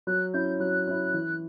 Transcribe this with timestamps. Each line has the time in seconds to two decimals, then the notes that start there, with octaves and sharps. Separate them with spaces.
0.07 F#3 F#6
0.34 C#4 E4 G6
0.60 F#3 F#6
0.87 C#4 E4
1.14 E3